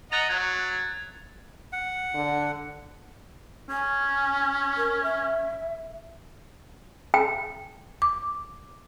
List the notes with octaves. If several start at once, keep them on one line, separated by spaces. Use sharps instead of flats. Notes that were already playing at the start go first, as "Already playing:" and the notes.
D#5 F#5 A#5 F#6 A6 F7
F#3 G#6
F#5
D3
C#4 G#5
A#4
E5
G5
D6